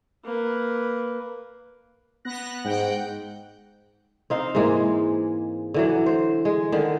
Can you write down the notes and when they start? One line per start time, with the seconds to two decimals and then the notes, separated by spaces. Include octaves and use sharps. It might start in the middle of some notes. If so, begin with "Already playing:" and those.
0.24 A#3 B4
2.25 B3 F#6 A#6
2.64 G#2 F#5 G5
4.30 C4 D#4 F5
4.55 G#2 E3 G#3 A#3
5.74 D3 E3 F#3
6.06 C5
6.45 G#3
6.72 D3 D#3